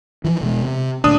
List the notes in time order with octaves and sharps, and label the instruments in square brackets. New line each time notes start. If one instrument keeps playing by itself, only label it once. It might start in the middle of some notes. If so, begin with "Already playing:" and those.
[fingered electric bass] E3 F3
E1 B2 G#3
C3
[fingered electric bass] D2 A#2 [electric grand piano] D4 D#6